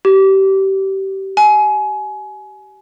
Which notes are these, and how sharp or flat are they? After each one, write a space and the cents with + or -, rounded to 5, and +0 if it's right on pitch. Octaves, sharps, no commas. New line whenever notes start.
G4 -25
G#5 +25